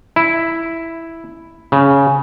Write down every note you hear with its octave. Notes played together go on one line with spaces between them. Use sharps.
E4
C#3